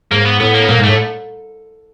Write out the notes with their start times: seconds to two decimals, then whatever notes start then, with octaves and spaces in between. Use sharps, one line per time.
0.11 G#2 A#3
0.25 B3
0.40 A2 B3
0.55 A#3
0.62 B3
0.69 A#2 A#3
0.78 G#2
0.84 A2 A3